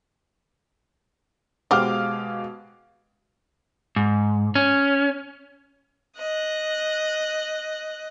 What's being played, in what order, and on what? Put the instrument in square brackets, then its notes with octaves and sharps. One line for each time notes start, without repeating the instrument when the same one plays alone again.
[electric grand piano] B2 G#3 F5 [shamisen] G4 C5 F#5 [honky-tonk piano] D6 F6
[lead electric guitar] G#2
C#4
[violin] D#5 F#6